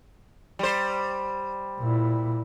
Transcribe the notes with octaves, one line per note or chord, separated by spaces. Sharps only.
G3 C5
A#2 E4